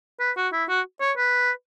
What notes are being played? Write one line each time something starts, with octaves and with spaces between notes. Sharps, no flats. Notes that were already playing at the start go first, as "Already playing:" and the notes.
B4
F#4
E4
F#4
C#5
B4